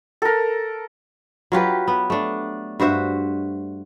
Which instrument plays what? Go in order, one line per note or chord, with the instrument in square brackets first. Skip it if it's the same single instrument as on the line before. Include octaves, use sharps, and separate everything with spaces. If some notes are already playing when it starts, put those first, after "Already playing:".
[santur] A4 A#4
[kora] F#3 F4 G4 B4
B3
A3 D4
G2 F#4 C5 E5